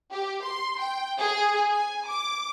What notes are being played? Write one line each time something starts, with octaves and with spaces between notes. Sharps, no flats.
G4
C6
G5
G#4
G#5
D6